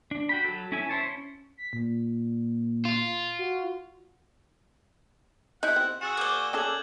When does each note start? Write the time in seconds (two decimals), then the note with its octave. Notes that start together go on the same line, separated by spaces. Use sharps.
0.11 D4
0.29 F#4 G5 B5
0.44 F#3 A4
0.72 C#4 E4 A4 G#5
0.89 E4 C5 C#5 A5
1.03 C#4
1.58 B6
1.73 A#2
2.85 F4
3.39 F#4
5.63 D#4 E4 F#5 F#6
5.76 C4
6.01 F#4 G#4 E6 A6 E7
6.17 A#3 D5 D6 G6 G7
6.53 C#4 G#4 A4 F#6 G#6 F#7